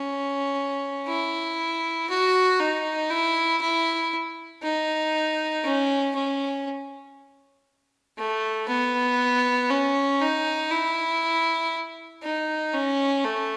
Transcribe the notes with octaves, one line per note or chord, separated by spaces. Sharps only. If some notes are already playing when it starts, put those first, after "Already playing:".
Already playing: C#4
E4
F#4
D#4
E4
E4
D#4
C#4
C#4
A3
B3
C#4
D#4
E4
D#4
C#4
A3